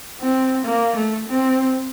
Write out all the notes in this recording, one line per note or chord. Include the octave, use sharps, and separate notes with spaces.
C4
A#3
A3
C4